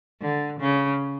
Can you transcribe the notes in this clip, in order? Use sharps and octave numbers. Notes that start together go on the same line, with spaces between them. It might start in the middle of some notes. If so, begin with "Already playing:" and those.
D3
C#3